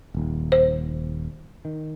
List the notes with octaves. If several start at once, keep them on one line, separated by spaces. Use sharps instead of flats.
D#1 D#2
C5
D#3